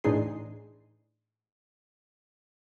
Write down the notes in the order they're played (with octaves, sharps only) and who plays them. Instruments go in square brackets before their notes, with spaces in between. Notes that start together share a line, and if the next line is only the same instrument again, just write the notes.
[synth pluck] A2 E3 D4 D#4 G#4 C6